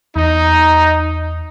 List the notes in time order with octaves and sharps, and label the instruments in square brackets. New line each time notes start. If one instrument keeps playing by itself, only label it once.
[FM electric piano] E2 [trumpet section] D#4